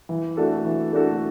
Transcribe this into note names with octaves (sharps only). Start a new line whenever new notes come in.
E3
A3 D4 F#4 A4
E3
A3 D4 F#4 A4